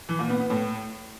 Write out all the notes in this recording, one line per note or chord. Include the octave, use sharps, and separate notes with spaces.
E3
A#2
B3
B3
A2